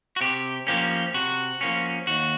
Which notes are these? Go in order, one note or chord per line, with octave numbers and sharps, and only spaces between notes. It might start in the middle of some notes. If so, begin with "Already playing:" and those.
F#4
C3 G4
F3 A#3 C#4 G4
C3 F#4
F3 A#3 C#4
D#2 F#4